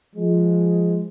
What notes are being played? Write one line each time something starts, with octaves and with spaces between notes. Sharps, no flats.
F3 G#3